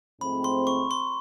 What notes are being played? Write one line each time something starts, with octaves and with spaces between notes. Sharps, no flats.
G#2 F3 A3 C4 B5
C6
C#6
C6